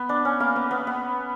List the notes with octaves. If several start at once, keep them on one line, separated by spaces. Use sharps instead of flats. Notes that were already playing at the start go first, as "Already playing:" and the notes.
Already playing: B3
D4
C#4
A#3
B3
B3
B3